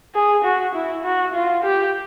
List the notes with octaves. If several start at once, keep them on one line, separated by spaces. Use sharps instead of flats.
G#4
F#4
E4
F#4
F4
G4